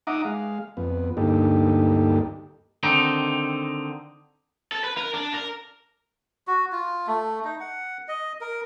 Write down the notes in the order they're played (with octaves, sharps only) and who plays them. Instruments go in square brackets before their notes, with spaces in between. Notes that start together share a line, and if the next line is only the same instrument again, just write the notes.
[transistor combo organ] D#4 E5 F#5 A#5 D6 D#6
G#3 F5
F2 B3
D2 G2 A#3 D#4 G4 A4
[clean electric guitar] D3 D#3 C4 D#4
[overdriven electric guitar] A4
B4
A#4
D4
A#4
[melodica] F#4
F4
A3
D#4
F#5
D#5
A#4